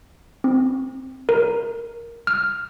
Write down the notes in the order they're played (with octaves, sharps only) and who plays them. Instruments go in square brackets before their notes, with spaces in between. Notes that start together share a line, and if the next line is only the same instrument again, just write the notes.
[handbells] C4
A#4
F6